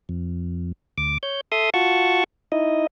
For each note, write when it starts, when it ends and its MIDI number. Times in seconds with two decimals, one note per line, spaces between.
0.09 0.72 41
0.98 1.18 38
0.98 1.18 86
1.23 1.41 73
1.23 1.41 91
1.52 1.70 69
1.52 1.70 76
1.52 1.70 84
1.52 1.70 87
1.74 2.24 65
1.74 2.24 66
1.74 2.24 78
1.74 2.24 81
1.74 2.24 85
2.52 2.87 63
2.52 2.87 64
2.52 2.87 75